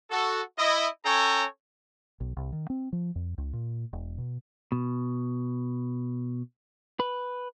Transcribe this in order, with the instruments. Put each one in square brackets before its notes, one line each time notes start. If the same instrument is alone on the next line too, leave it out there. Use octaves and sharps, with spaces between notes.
[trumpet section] F#4 A4
E4 D#5
C#4 A4 C#5 G5 G#5 A#5
[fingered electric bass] B1
C2
D#3
C4
F3
F2
C#2
A#2
E1
B2
[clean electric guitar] B2
B4